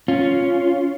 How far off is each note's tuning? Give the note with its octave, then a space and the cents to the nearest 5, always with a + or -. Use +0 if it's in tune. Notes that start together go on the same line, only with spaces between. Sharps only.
C#4 +0 F4 +0